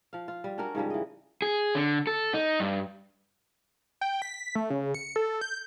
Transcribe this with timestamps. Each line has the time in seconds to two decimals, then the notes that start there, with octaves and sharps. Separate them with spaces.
0.13 F3 F5
0.28 F4
0.44 G3
0.58 C#4 D4 F#4 A#4
0.75 G#2 C#3 F3 G3
0.90 E3 D#5
1.42 G#4
1.75 D3
2.07 A4
2.34 D#4
2.60 G2
4.01 G5
4.22 B6
4.55 A3
4.70 C#3
4.94 C#7
5.16 A4
5.41 G6